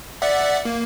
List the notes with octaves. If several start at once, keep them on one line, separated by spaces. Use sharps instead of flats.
D5 E5 F#5
A#3